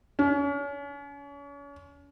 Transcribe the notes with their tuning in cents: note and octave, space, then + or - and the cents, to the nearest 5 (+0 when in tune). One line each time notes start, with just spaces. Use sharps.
C#4 +35